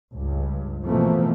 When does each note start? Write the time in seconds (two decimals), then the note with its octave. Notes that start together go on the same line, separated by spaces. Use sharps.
0.14 C#2 G2
0.84 B2 E3 F3 A3 A#3 C4